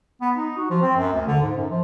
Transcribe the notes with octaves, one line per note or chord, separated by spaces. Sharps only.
B3
D#4
F#4
F3
C4
F#2
D2
D3
G#2
F#2
F3